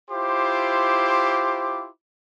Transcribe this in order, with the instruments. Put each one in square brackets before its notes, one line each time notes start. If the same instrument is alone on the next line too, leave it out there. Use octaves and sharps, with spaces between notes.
[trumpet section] E4 F4 G4 C5 C6 D6